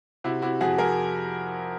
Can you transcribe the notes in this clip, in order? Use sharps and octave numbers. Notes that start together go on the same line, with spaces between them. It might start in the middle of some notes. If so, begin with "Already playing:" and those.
C3 E4 F#4
C3 E4 F#4
F2 F#4 G#4
F2 G#4 A#4